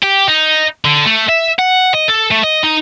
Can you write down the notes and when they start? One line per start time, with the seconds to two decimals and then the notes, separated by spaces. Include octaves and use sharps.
0.03 G4
0.28 D#4
0.85 D3
1.05 A3
1.29 E5
1.59 F#5
1.94 D#5
2.09 A4
2.32 A3
2.44 D#5
2.64 D#4